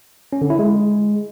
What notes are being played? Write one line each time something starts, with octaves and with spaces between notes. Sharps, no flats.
C#4
D3
E4
G#3